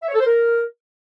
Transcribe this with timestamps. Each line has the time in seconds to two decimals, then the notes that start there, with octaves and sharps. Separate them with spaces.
0.03 E5
0.08 C#5
0.14 A4
0.20 C5
0.25 A#4